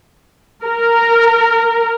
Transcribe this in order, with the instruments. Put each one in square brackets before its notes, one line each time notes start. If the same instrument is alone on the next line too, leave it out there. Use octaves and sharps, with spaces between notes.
[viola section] A#4